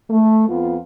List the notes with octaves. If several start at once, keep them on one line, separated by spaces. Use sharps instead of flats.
A3
F2 B3 F4